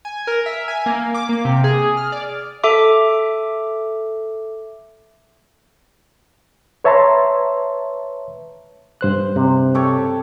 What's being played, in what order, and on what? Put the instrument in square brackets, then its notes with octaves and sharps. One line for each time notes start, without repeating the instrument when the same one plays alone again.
[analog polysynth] G#5
A#4
E5
G#5
A#3
D6
A#3
C3
G#4
F6
D5
[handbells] A4 E5 D6
[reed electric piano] B4 C#5 E5 A5 A#5 C6
G2 C5 F#6
[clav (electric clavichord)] C3
[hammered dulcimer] G4 A4 C#5